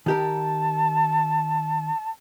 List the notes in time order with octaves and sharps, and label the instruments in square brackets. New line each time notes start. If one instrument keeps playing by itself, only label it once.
[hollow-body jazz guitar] D#3 G4 A#4 [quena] A5